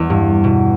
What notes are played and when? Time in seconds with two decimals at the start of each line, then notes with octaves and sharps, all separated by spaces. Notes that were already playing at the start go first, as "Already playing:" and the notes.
Already playing: E2
0.10 G2
0.44 B2